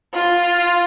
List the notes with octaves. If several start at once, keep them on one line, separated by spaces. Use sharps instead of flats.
F4